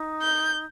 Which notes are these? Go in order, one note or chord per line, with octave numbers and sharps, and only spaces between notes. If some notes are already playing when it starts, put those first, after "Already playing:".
Already playing: D#4
G6